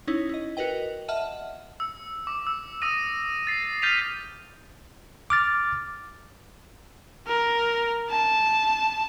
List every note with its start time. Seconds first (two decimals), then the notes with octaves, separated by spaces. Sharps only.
0.07 C#4 D#4 E4 C#5
0.29 E4 D#5
0.57 F#4 A#4 B4 D#5 G5
1.08 D#5 E5 F#5 A5 F6
1.80 E6
2.27 D6
2.47 E6
2.82 D#6 E6 A#6 D#7
3.47 A6 C7
3.82 F6 G6 A6 B6 D#7 F7
5.30 D6 F6 A6
7.27 A#4
8.11 A5